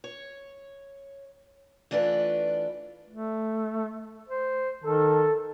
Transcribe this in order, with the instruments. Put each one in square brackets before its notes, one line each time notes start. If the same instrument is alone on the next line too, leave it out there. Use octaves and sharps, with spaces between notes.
[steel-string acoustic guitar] C#5
E3 A3 D4 F4 B4
[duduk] A3
C5
[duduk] D#3 [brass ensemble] A4